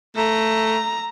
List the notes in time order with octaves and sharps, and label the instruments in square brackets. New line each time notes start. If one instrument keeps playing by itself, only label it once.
[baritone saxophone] A3 [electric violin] A#5